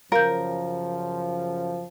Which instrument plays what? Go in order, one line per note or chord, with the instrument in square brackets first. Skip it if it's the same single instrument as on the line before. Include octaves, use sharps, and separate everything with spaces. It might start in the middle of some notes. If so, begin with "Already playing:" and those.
[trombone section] F#2 C#3 F3 [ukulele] A#4 [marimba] F5 G6